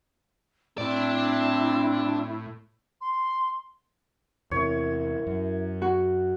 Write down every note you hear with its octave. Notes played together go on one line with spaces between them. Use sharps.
A2 C4 D4 E4 D5
C6
E2 C3 E4 A#4 C#5 E5
F#2
F#4